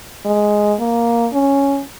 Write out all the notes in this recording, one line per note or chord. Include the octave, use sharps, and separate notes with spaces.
G#3
A#3
C#4